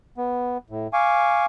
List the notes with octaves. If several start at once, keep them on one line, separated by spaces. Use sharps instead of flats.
B3
A2
F5 G#5 C#6 D6